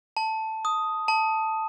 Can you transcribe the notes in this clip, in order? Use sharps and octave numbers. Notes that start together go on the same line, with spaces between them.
A5
D#6
A5